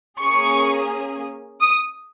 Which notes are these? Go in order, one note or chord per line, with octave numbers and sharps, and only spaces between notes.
A#3 C#4 G#4 C#6
D#6